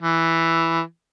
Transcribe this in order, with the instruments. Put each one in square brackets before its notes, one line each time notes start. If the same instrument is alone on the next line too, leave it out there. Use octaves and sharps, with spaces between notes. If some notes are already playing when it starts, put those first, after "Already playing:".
[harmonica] E3